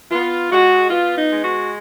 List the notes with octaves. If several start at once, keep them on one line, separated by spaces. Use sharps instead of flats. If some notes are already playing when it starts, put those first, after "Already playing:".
B3 F4
G#3 F#4
B3 F4
D#4
G#3
F#4